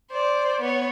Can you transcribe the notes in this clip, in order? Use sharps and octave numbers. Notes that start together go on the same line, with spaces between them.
C5 D5
B3 C#5